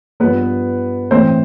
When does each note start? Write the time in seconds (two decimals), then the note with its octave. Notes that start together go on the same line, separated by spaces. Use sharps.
0.20 G2 F3 B3 B4
1.11 A2 E3 C4 C5